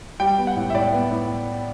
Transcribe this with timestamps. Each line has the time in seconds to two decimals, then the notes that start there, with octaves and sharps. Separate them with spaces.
0.20 G3 G5
0.38 B3
0.47 F#5
0.56 A2
0.70 E5
0.74 A2 D5
0.93 B3
1.11 A2